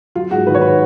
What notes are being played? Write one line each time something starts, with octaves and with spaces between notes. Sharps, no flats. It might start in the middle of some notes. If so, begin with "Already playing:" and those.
F#3 F4
G#2 F#4
D#3 B4
C#5
B4